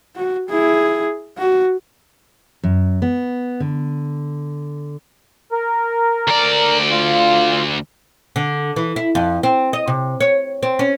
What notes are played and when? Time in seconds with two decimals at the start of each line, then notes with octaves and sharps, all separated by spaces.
0.16 F#4
0.49 E4 G#4
1.38 F#4
2.63 F#2
3.02 B3
3.60 D3
5.52 A#4
6.27 D2 D5
6.91 F4
8.36 D3
8.76 E3
8.96 E4
9.15 F2
9.43 C4
9.73 D#5
9.87 C3
10.20 C#5
10.63 C4
10.79 C#4